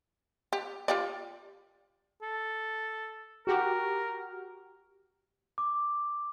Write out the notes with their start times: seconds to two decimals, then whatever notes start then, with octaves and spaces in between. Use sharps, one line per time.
0.53 G4
0.88 F4 G4 D5
2.22 A4
3.47 F#4 G4 A#4
5.58 D6